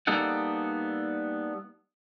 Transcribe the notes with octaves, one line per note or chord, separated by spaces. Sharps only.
G3 A#3 B3 D#4 A4 F#5